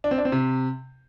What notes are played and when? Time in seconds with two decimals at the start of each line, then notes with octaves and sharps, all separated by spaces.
0.04 D4
0.11 C4
0.18 D4
0.25 C4
0.32 C3